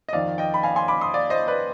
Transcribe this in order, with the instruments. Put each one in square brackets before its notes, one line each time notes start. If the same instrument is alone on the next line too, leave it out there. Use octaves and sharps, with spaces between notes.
[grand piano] D#5
F2 D#3 D5 F5
D#5 G5
B5
F5 G#5
G#5 C6
B5 D6
C6 D#6
D5 F5
C5 D#5
B4 D5